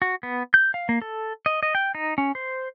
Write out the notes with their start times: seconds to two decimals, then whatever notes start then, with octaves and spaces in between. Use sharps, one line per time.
0.02 F#4
0.23 B3
0.54 G6
0.74 F5
0.89 A#3
1.02 A4
1.46 D#5
1.63 D#5
1.75 G5
1.95 D#4
2.18 C#4
2.35 C5